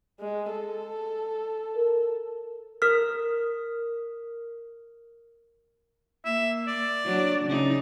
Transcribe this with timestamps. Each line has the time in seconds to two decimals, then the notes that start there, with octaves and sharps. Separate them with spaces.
0.20 G#3
0.51 A4
1.76 A#4
2.82 A#4 F6
6.25 A#3 E5
6.68 D5
7.05 F#3 D4
7.45 C#3 D#4